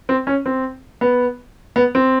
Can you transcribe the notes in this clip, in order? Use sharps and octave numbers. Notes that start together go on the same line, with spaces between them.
C4
C#4
C4
B3
B3
C4